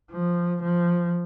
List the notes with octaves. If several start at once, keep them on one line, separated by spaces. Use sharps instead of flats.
F3
F3